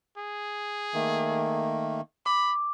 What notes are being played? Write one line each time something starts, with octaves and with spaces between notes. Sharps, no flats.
G#4
D#3 A3 A#3
B5 D6